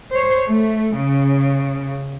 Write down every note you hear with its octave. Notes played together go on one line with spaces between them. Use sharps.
C5 C#5
A3
C#3